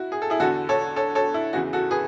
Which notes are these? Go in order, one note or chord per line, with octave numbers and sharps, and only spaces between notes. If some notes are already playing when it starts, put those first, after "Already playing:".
Already playing: E4 F#4
G#4
A4
E4 G#4
E2 D3 F#4 A4
A4 C#5
A4 C#5
A4 C#5
E4
E2 C#3 E3 F#4
F#4 A4
G#4 B4